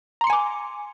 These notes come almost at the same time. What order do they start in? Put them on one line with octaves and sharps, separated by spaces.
A#5 C6 C#7 G#5 D6